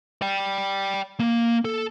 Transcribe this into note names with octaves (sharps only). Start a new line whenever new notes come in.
D5 G5
A#3
A4